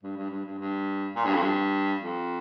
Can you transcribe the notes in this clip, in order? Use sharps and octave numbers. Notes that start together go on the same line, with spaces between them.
G2
G2
G2
G2
G2
A#2
G2
F2
G2
F2